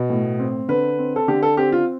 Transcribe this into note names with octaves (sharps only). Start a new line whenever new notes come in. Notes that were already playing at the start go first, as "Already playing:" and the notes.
Already playing: B2
A2
C4
D3 B4
C4
A4
D3 G4
A4
C4 G4
F4